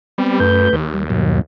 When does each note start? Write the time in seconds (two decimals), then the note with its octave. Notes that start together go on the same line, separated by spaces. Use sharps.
0.18 G3 B3 C4
0.40 F#2 A3 B4 G6
0.73 D#2
0.94 G3
1.10 G2 B2 F#3